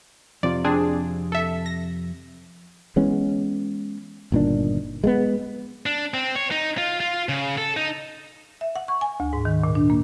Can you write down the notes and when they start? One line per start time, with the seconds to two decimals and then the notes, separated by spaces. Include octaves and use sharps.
0.43 F2 C3 F4 D5
0.64 C4 D4 G#4
1.32 A4 E5
1.66 A#6
2.96 E3 G#3 B3 C#4
4.32 G1 A#2 D#3 D4
5.04 G#3 A3 B3
5.86 D4
6.14 C4
6.36 C#5
6.51 D#4
6.78 F4
7.00 F4
7.29 C#3
7.58 A4
7.77 D#4
8.61 E5
8.76 F#5
8.88 C#6
9.01 G#5
9.20 D2
9.33 G#2
9.45 D#3
9.64 A#2
9.75 D4
9.90 A#3